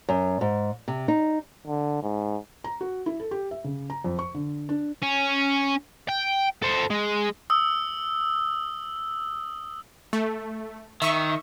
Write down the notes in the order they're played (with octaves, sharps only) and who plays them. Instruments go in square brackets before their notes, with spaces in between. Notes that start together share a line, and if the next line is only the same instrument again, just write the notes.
[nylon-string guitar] F#2
G#2
C3
D#4
[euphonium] D3
G#2
[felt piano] A#5
F#4
E4
A4
G4
E5
C#3
A#5
F2
C#6
D3
D4
[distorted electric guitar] C#4
G5
A4 C5
G#3
[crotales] D#6 E6
[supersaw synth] A3
[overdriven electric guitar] D#3 [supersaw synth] E5 C#6